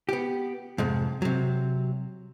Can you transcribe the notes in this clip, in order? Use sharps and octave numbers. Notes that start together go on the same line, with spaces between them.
B3 G4
F2 G#2 C3
C3 F#3